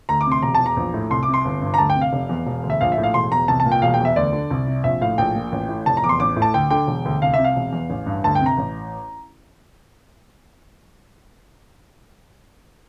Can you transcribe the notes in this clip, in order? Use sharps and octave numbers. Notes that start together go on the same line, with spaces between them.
D2 A#5
D6
C3
C6
E1 A#5
A5
E2
A#5
A#1
A2
C2 C6
D6
C3
C6
G1
G2
A#5
D2 A5
G5
C3
F5
F1
E2
E1
D2
E5
A#1 F5
E5
A2
F5
E1 C6
E2 A#5
C2 A5
A5
A#2
G5
E1 F5
G5
E2
E5
D2 D5
D3
C2
C3
A#1 E5
A2 F5
A#1 G5
A#2
A1
A2
F1 A5
A#5
E2 D6
C6
A1 D6
A2
A5
D2 G5
D3 G5
E1
D2
C2 F5
C3 E5
F5
E1
E2
A1
G2
D2 A5
C3 G5
A#5
A1